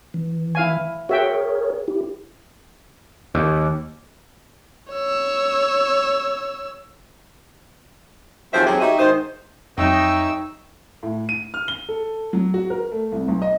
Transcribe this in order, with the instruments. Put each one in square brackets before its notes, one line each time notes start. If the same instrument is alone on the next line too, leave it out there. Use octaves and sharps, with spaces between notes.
[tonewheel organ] E3
[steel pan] E4 F5 G#5
[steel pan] F#4 E5 G5 [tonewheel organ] G#4 A#4 C#5
[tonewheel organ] E4 G4
[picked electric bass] D#2
[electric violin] C#5 E6
[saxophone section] D#2 F3 F#3 C4 G#4 E5
E2 F#3 C4 G4 G#4
D#4 F#4 G4 D#5 E5
G#2 D#3 D#4 C5
[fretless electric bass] F2 F#3 [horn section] D#4 [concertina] C#5 E5 A#5 [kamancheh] G5 E6
[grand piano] A2
D#7
F6
G7
A4
F#3
F#4
A#4
A3
C2
B1
D#5